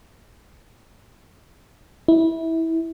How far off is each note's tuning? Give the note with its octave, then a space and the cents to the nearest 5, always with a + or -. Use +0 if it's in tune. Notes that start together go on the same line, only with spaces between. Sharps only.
E4 -20